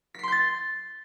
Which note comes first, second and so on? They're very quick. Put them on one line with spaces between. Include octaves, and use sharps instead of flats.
B6 C7 C6 G6 A6